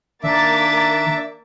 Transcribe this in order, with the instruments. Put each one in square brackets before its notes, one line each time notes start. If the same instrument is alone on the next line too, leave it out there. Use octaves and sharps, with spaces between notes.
[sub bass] D#3 [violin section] A#3 D6 A6 [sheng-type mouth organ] D4 E5